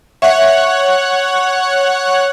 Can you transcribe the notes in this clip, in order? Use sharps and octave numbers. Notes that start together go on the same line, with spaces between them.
C#5 E5 F#5 F#6